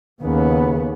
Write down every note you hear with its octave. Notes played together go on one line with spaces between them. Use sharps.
D#2 C#3 B3